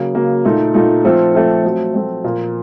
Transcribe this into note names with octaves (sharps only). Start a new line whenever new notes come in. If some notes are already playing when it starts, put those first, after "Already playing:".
Already playing: C#3 F#3 A#3
C#3 F#3 A#3
A#2 A3 D#4
A#2 A3 D#4
F3 A3 C4 F4 A4
F3 A3 C4 F4 A4
F#3 A3 C4
F#3 A3 C4
A#2 F3 A#3